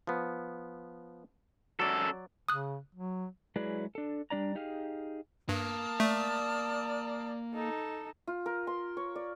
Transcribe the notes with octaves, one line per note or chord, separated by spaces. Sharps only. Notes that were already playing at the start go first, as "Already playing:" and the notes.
F3 B3
F#2 F#3 A4 D5
C#3 D#6 F#6
F#3
F#3 G#3 E4 G#4 B4 D5
D4 A4
G3 D4 D5 A#5
D#4 G4 G#4 F5
G2 A#3 A5 D#6 F6
A3 D5
D#4 A4
F4
A#4
C6
C#5
D5